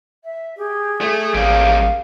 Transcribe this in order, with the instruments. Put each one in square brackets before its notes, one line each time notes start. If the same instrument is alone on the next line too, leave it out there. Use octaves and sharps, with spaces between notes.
[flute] E5
[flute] G4 [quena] G#4
[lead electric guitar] A3
[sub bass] A1 [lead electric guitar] G3 A#3 [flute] F5